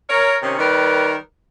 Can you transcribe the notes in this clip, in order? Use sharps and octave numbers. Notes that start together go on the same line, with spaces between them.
A#4 C#5
C3 D#3 C#4
D#3 G3 D#4 A#4 B4